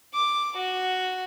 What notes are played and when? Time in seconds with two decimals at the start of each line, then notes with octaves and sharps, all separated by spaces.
0.14 D6
0.57 F#4